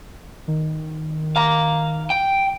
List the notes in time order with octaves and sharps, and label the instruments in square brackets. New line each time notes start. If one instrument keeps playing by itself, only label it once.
[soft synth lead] D#3
[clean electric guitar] F5 A#5
G5